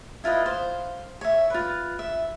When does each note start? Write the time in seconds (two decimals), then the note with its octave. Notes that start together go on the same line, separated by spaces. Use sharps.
0.24 E4 F4 B4 D#5
0.46 C5 F5
1.21 C#5 E5
1.50 F4 B4
1.99 E5